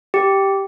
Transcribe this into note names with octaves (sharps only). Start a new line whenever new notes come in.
G4